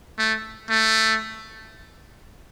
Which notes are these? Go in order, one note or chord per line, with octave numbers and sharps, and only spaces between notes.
A3
A3